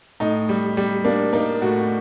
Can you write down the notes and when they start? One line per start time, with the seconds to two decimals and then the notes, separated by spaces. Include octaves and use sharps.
0.20 A2 D#4
0.49 G3
0.77 G3
1.04 A#3 D4
1.33 A#3 D#4
1.61 A2 F#4